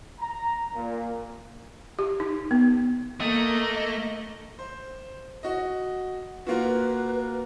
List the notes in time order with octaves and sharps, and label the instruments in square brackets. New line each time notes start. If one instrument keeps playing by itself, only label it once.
[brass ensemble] A#5
A#2
[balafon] G4
D#4
B3
[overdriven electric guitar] A3 [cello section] A#3 [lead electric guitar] D#5
[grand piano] C5
F#4 D#5
[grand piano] A#3 F4 F#4 [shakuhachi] B4